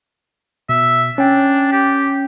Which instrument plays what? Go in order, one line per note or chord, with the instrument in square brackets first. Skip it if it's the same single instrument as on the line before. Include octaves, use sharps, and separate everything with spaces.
[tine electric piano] B2 [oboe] E5
[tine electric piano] C#4 G5 [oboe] D4
[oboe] G4